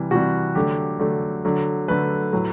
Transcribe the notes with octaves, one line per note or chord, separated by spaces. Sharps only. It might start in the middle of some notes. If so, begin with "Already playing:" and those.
Already playing: C3 E3 G3
C3 E3 G3 F#4
D3 F#3 A3 G4
D3 F#3 A3
D3 F#3 A3
D3 F#3 A3 B4
A2 F#3 A3